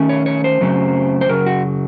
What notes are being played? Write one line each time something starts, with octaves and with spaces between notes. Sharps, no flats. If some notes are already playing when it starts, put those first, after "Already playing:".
Already playing: D#3 A3 C#4
C#5
C#5
C5
F#2 C#3 F#3 A3 C4
C5
F#2 C#3 F#3 A#4
F#4